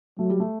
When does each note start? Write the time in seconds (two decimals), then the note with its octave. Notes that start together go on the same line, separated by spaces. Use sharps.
0.18 F#3 A3
0.30 G3
0.40 A3